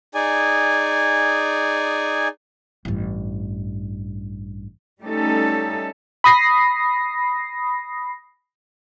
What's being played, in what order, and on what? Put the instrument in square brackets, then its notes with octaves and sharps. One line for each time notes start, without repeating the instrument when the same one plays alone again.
[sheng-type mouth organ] D#4 G#4 D5 G#5
[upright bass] A1 G2
[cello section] G3 A3 C#4 D#4 A4
[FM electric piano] B5 D#6 A#6 C7